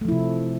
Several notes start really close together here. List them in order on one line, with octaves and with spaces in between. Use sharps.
A3 F3 E4 C3